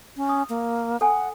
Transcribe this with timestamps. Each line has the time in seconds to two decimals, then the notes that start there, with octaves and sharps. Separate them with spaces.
0.17 C#4
0.29 D#6
0.49 A#3
1.01 A4 F#5 G#5